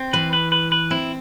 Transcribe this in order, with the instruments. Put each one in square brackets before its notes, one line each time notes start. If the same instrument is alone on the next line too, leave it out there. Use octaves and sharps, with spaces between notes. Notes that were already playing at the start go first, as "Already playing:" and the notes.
Already playing: [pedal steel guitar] C4
[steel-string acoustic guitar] E3 [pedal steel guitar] B4
[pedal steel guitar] B4
B4
B4
[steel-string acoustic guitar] C4 [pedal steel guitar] E4